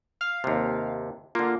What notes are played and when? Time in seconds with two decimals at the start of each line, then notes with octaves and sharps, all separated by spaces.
0.21 F5
0.44 D#2 C3
1.35 D3 A#3 F4